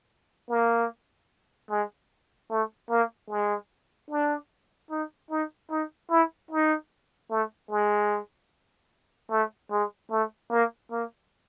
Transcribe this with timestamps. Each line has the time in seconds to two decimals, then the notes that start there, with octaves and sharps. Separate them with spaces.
0.50 A#3
1.70 G#3
2.50 A3
2.90 A#3
3.30 G#3
4.10 D4
4.90 D#4
5.31 D#4
5.71 D#4
6.10 E4
6.51 D#4
7.31 A3
7.71 G#3
9.31 A3
9.71 G#3
10.11 A3
10.51 A#3
10.91 A#3